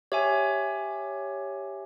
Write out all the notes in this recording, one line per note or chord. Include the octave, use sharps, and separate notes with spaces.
G4 C#5 E5 G#5